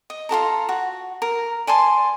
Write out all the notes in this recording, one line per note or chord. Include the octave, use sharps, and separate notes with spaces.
D#5
F4 F#4 A4 A#5
F#4
A#4
D5 G#5 A5 C6